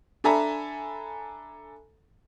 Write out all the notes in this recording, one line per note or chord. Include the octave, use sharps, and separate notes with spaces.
D4 A4 E5 G#5 A#5 B5